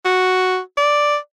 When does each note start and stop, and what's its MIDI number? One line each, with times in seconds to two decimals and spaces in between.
0.05 0.59 66
0.77 1.17 74